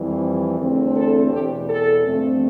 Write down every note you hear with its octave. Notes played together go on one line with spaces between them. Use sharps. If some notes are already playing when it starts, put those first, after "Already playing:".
Already playing: F2 E3 G3
E2 D3 A3 C4
A4
E2 B2 B3 G4
A4
G2 F3 A3 C4